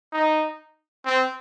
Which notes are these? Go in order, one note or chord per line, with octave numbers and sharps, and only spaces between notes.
D#4
C4